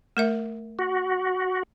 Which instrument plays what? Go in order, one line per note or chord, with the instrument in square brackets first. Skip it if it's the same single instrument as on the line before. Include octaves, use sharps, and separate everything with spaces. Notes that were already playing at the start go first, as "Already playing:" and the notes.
[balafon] A3 A#4 E5
[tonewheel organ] F#4